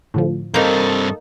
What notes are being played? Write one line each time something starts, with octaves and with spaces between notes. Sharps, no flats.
A2 D3 F3
G2 A#3 C4 D#4 A4 C#6 D#6 G6